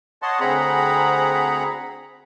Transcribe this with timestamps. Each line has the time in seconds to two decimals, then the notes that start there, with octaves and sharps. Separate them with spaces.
0.22 C#5 D#5 F#5 A5 C6
0.40 D2 C4 G#4 F#5 A#5 B5